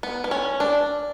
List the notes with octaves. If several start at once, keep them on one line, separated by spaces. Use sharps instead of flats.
B3
B3
C#4
D4